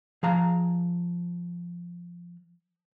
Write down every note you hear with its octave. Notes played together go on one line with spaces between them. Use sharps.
F3 G#4 F5 A#5